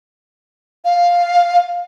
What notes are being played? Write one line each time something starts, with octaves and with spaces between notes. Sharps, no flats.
F5